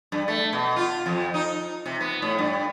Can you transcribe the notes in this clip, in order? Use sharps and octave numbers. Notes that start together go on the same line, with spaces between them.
G2
A3
B2
F4
F2
D#4
C3
B3
A2
G2